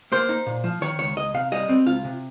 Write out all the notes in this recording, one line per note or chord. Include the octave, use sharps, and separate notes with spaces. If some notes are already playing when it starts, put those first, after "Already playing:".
A#3 C5
D#4
A#2
F3
D#3 C#5
C#2 C#5
C#2 D#5
C3 F5
G3 D#5
C4
C#2 F4
C3